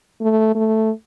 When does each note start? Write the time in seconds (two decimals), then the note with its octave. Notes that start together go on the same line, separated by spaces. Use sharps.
0.21 A3
0.55 A3